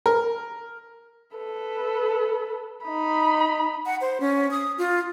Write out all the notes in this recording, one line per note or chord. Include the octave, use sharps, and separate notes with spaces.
A#4
A4 B4
D#4 B5
F#5
C5
C#4
D#6
F4